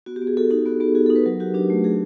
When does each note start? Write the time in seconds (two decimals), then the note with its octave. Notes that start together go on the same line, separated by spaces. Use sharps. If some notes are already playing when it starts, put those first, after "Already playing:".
0.06 B3 F#4
0.16 G4
0.22 B3
0.27 G#4
0.37 F#4 A4
0.51 D#4 G4
0.66 B3 F#4
0.80 B3 G4
0.95 F#4 G#4
1.06 A4
1.10 D#4
1.16 B4
1.26 F#3 A#4
1.40 F#4 G4
1.54 D4 G4
1.70 A3
1.84 F#3 G#4